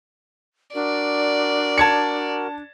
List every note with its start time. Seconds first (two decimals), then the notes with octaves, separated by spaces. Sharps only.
0.75 D4 F#4 A#4 D5
1.78 A5 G#6 C#7